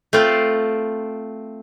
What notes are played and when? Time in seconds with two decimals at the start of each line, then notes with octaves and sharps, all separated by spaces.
0.13 A3 C4 F4